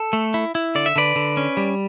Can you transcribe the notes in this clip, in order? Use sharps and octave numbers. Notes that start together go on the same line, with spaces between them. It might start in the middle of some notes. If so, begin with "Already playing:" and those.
Already playing: A4
A3
E4
E4
D3 D5
E5
D3 B4 D5
D3
C#4
G3